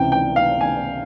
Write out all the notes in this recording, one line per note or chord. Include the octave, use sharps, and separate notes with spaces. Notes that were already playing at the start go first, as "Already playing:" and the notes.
Already playing: C#2 C3 E3 G5
G5
F5
G#5